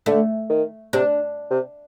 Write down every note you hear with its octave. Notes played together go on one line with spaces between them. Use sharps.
D3 A3
D#3
C3 D4
C3